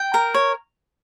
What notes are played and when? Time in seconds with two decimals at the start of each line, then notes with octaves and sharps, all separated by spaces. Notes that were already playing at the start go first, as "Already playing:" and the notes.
Already playing: G5
0.14 A#4
0.34 C#5